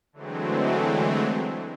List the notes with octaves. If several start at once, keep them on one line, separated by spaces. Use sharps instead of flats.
D3 E3 F#3 G#3 A3 C4